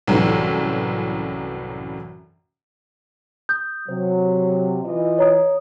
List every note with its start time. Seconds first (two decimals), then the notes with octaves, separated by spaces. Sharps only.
0.07 C2 F#2 A2 E3
3.49 D#6 G6
3.88 C3 F#3 C5
4.84 E3 F4 D#5
5.18 C#5 A#5 D#6